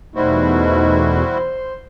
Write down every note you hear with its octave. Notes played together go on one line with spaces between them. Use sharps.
E2 B2 G3 A3 D#4 E4 F#4 C5